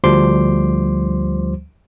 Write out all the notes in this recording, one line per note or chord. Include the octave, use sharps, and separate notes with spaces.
D2 F3 G3 C5 C6 D6